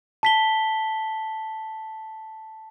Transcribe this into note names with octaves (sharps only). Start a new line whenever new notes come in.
A5 B6 G7